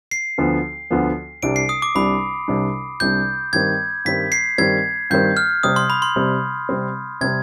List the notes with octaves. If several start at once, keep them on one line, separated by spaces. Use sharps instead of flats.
C7
D2 D3 F3 B3
D2 D3 F3 B3
C2 C3 G3 D4 D7
C7
D#6
D6
C2 C3 G3 D4 B5
C2 C3 G3 D4
C2 C3 G3 D4 G6
G2 D#3 G3 C4 G#6
G2 D#3 G3 C4 B6
C7
G2 D#3 G3 C4 G#6
G2 D#3 G3 C4 G6
F6
C3 G3 C4 D#6
C6
B5
C6
C3 G3 C4
C3 G3 C4
C3 G3 C4 G#6